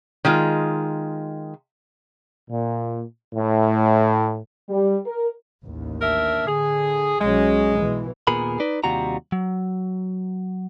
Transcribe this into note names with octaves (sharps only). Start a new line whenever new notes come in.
D#3 G#3 F4
A#2
A2
G3
A#4
A1 D#2
D4 A#4 E5
D3 G#4
B1 F#3 G#3 C#4
B1 B2 E3
D#2 A#2 B3 G#4 A#4 B5
D#4 B4 D5
D#2 C3 G3 F4 F#4 A#5
F#3